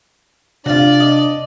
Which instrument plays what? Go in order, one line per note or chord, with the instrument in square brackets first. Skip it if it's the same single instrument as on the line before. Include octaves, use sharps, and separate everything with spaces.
[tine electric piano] C3 [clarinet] D4 [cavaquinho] F4 F#4 [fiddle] D5
[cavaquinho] D#5